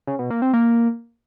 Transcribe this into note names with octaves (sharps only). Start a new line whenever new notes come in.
C#3
B2
A#3
C4
A#3